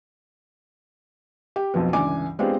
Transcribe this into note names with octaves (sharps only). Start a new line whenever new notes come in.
G4
B1 F2 F3 B3
G1 C#2 E3 D4 G#5 D6
G#3 B3 C4 D4 F4 G4